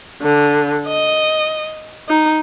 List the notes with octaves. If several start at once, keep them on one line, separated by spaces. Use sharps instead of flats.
D3
D#5
D#4